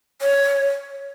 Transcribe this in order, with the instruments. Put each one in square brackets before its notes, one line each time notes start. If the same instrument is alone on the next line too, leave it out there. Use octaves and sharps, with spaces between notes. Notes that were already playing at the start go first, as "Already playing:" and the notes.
[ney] C#5